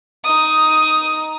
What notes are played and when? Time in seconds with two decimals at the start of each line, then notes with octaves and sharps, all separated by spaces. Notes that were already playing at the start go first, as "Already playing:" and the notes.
0.24 D#4 D#6